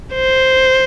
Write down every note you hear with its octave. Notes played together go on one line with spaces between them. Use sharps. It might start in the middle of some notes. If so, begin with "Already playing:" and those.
C5